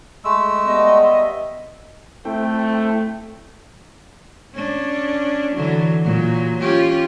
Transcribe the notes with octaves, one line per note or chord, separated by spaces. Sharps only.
G#3 A3 E6
G3 B3 D#5
E5
A3 C4 E4 G5
C#4 D4
D3 E3 F#3
A#2 F#3
C#4 F4 G4